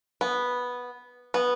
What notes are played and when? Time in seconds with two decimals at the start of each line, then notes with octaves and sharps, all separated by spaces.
0.21 B3
1.34 B3